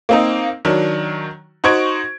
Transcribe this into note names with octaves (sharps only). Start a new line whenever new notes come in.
A#3 C4 D#4
D#3 F#3 D4
D#4 F#4 C5 C#6 G#6 D7